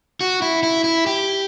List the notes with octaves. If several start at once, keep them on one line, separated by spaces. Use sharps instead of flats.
F#4
E4
E4
E4
G4